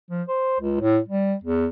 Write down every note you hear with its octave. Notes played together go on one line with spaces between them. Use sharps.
F3
C5
C#2
A2
G3
E2